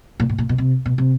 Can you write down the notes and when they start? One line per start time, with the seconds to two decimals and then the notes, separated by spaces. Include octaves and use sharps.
0.20 A#2
0.29 A2
0.38 A#2
0.49 B2
0.58 C3
0.86 B2
0.98 C3